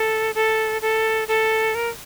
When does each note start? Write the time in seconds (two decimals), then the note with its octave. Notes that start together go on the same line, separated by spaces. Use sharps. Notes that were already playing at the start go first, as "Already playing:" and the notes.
Already playing: A4
0.35 A4
0.82 A4
1.28 A4
1.75 A#4